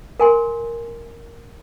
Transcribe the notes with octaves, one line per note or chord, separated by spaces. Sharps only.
A#4 G#5 C6